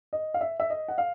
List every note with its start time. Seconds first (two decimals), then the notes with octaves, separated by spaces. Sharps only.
0.13 D#5
0.34 F5
0.41 E5
0.60 E5
0.70 D#5
0.88 F#5
0.98 F5